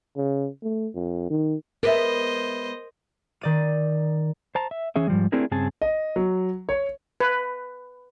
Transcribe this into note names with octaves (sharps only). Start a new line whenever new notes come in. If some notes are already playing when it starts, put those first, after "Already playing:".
C#3
A3
F2
D#3
G#3 B3 A#4 C5 D#5 E5
D#3 D5 D#7
C5 A5 A#5
E5
E3 C#4 G#4 E5
G#2 F3 G3
A3 C4 D4 E4 G#4 A#4
G2 C#3 C4 G#4 G#5 A5
D#5
F#3
C#5
B4